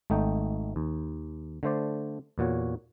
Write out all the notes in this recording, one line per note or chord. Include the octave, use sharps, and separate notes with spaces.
G#1 A3 D#4 G5
D#2
D3 A3 C5 D5
E2 A#2 F#4 C#5